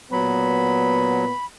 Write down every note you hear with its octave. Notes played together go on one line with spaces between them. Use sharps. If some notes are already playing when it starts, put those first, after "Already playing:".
A#2 F#3 B3 B5